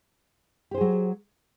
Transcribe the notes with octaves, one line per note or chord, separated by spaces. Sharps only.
F#3 G4 G#4 C5